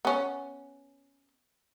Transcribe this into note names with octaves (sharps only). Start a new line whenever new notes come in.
B3 C#4